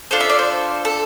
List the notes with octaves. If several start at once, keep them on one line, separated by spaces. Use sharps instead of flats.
D4 F4 A4 C5
E5
D5
C5
A4